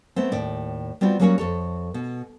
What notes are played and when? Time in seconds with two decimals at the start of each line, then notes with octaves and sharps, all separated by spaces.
0.16 A3 B3 C4
0.32 D#2 A2 D5
1.01 G3 B3 C4 F4 F#4
1.20 F#3 G3 A#3 C#4 F#4 C#5
1.38 F2 A4 C#5
1.94 B2